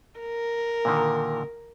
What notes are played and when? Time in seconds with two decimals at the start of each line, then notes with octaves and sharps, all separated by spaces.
0.20 A#4
0.85 A#2 D3 D#3